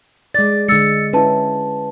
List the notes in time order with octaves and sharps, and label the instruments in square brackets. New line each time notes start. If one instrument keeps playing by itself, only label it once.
[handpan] G#3 D5 [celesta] A6
[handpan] D3 G#3 [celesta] E6 A6 C#7
[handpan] C#4 E4 [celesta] B4 A5